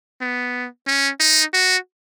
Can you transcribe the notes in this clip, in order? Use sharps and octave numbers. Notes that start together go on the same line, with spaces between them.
B3
C#4
D#4
F#4